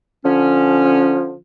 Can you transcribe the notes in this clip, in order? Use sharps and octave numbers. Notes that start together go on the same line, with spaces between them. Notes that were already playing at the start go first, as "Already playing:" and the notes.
D3 F3 C#4